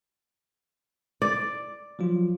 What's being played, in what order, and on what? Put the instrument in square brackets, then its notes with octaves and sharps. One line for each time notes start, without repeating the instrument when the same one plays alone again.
[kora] D5
[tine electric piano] F3 F#3 F4